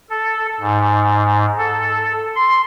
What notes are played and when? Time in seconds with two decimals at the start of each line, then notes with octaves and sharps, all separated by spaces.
0.10 A4
0.61 G#2
1.58 A4
2.36 C6